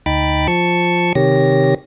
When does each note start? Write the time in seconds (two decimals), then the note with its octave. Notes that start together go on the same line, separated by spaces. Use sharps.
0.06 D2 D#4 G5 B5 A6
0.48 F3 A5 C#6
1.15 C3 D#3 G4 C#5 A#6